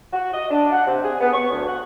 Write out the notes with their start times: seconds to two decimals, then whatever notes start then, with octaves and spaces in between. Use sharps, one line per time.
0.13 F#4
0.34 D#5
0.50 D4
0.72 F#5
0.87 C3
1.03 G#4
1.21 B3
1.33 C#6
1.52 D2
1.68 F#5